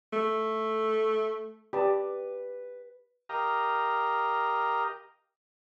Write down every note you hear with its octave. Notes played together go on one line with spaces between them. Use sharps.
A3
G4 B4 D5 A5
G4 A#4 D#5 F5 A#5